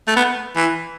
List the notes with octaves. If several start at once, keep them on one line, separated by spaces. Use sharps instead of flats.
A3
B3
E3